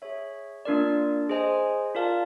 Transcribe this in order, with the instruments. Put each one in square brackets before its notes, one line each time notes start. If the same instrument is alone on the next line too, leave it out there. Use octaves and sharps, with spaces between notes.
[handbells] G#4 C#5 E5
A#3 D4 F4 A#4 D5
G#4 C5 D#5 G#5
F4 A#4 D5 F5 A5